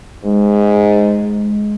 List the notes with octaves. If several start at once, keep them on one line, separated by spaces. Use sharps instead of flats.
G#2 G#3